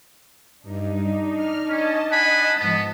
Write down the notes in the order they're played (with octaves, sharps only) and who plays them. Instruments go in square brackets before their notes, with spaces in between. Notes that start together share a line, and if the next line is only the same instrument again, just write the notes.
[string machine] G2 [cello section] D4 D#4
[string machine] F6
[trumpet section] C#4 [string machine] D#5 A5
[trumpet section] F#5 G#5 B5
[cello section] G#2 F3 [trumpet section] B3